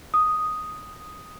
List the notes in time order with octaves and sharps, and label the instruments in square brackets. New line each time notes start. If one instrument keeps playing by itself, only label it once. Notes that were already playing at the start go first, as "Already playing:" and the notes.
[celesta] D#6